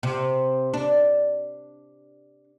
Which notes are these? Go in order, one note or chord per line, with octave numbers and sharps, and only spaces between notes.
C3
D4